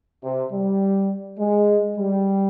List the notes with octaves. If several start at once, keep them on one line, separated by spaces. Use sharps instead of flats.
C3
G3
G#3
G3